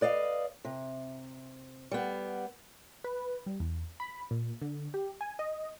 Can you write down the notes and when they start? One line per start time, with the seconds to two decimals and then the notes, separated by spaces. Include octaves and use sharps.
0.01 B4 D5 D#5 F5
0.65 C3
1.91 G3 B3
3.04 B4
3.46 G3
3.60 E2
4.00 B5
4.31 A#2
4.62 D3
4.94 G4
5.21 G#5
5.39 D#5